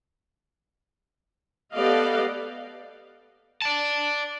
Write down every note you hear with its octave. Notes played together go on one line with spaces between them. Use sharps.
B3 G4 A4 D5 D#5 F5
D5 A5